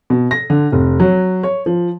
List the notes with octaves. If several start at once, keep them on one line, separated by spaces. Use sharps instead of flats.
B2
A#6
D3
F1
F#3
C#5
F3